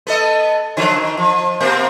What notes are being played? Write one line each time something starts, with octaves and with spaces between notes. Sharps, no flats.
B3 A4 D#5
D3 F3 F#3
D#3
F3
B2 A#3 C4